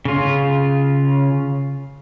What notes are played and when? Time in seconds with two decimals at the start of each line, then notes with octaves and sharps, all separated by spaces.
0.05 C#3 F4